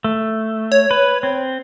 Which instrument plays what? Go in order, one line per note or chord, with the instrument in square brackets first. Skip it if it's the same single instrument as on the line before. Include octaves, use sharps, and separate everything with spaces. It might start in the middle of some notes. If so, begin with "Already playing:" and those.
[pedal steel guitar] A3
[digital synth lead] C#5
[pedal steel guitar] B4
C4